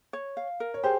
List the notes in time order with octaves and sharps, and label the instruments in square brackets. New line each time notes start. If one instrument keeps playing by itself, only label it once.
[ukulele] C#5
F5
A#4
[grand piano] C#5
[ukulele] G4 [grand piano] G#4 C5